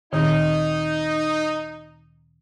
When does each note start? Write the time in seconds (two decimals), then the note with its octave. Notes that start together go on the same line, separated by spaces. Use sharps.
0.13 D2 A#2 D#3 D#4